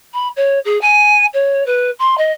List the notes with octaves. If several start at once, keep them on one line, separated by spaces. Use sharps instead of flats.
B5
C#5
G#4
G#5
C#5
B4
C6
D#5